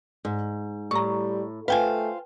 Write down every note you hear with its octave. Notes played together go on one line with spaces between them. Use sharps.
G#2
A2 G3 A#5 C#6
A3 F4 B4 C5 F5 G5 G#5